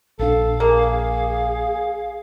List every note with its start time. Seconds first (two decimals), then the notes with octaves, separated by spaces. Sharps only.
0.19 A#1 D4 A4 F5
0.60 A#3 G#4